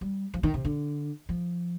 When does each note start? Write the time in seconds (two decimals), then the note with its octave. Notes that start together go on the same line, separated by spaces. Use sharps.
0.01 G3
0.34 F3
0.43 D#3
0.54 C3
0.65 D3
1.29 F3